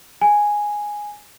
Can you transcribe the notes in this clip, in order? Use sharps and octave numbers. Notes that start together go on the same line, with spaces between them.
G#5